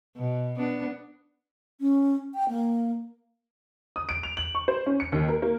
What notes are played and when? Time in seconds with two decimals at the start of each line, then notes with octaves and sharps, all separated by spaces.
0.17 B2
0.57 B3 D4
1.81 C#4
2.34 G5
2.49 A#3
3.96 D#6
4.09 D7
4.23 F7
4.37 F#7
4.55 C#6
4.68 C5
4.86 C#4
5.00 C#7
5.12 D#2
5.29 A#4
5.42 A#3